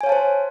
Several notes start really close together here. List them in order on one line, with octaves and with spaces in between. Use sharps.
G#5 C#5 F5 A5 C5